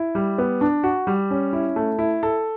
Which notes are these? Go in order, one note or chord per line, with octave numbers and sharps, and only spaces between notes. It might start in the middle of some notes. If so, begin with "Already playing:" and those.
Already playing: E4
G3
B3
D4
F#4
G3
C#4
E4
A3
E4
A4